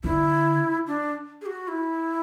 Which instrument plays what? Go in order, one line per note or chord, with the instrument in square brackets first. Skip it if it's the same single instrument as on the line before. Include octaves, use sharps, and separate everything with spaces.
[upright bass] D3 [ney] E4
[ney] D4
G#4
F#4
E4